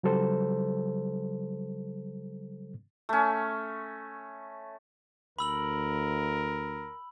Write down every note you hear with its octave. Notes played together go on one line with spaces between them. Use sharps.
C#3 F#3 G3 A4 C5
A3 C#4
D2 A#4 B5 E6 F#7